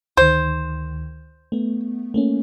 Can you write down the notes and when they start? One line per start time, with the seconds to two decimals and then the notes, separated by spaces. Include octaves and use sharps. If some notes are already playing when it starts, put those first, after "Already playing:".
0.17 D2 D#3 C5
1.52 A3 B3
2.14 A3 A#3 C#4